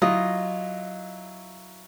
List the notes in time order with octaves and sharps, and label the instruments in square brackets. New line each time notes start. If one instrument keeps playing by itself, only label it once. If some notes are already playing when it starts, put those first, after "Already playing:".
[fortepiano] F#3 E4 [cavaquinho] F4 D#5